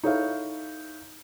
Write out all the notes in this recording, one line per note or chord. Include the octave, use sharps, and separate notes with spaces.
D#4 E4 A4 C#5 E5 F5